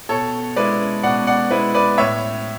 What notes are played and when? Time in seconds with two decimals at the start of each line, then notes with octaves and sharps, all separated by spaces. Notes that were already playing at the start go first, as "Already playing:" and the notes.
0.09 B2 A4 C#5
0.56 G#3 B3 E4 B4 D5
1.03 B2 D5 F#5
1.27 D5 F#5
1.51 G#3 B3 E4 B4
1.74 B4 D5
1.98 A2 C#5 E5